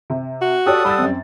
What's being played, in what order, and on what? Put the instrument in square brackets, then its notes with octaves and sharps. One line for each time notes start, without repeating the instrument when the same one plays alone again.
[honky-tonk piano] C3
[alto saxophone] F#4
[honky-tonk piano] G4 C#5 D5 [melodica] A4 F#5 D#6
[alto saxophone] G3 [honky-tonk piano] B5 E6 A6
[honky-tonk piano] F#2 C4